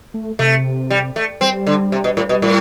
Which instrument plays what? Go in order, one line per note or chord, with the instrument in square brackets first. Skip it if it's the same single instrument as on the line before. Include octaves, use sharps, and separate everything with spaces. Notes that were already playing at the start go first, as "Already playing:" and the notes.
[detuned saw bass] A3
[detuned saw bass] C3 [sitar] A3
[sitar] G3
A3
[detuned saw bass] G3 [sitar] C4
[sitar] D3
C3
B2
A2
B2
A2